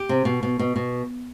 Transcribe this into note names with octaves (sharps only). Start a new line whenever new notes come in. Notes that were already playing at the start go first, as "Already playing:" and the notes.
Already playing: G4
C3
B2
B2
B2
B2